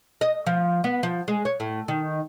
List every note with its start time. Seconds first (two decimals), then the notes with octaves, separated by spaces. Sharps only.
0.21 D#5
0.46 F3
0.84 B3
1.03 F3
1.28 G#3
1.45 C#5
1.60 A2
1.88 D#3